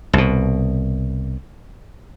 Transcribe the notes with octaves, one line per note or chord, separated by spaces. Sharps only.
C2 B2